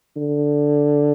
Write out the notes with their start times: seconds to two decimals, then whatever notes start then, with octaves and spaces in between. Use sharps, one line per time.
0.17 D3